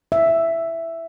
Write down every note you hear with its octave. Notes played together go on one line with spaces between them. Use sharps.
E5